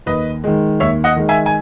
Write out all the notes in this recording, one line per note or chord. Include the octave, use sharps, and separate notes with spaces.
D#2 B4 D#5
D#3 G#3
D#2 C#5 E5
D#5 F#5
D#3 G#3
E5 G#5
G#5